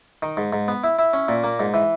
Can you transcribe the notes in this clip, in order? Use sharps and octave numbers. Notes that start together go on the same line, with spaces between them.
D#3
G#2
G#2
B3
E4
E4
C#4
A#2
A#3
G#2
E3